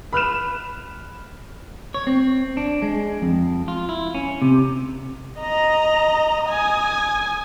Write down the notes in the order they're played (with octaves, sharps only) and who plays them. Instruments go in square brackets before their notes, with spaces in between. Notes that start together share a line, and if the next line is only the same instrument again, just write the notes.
[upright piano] B5 F6 F#6 E7
[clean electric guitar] C#5
C4
D4
G#3
F2
F4
E4
C#4
C3
[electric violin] D#5 A#5
G#5 D#6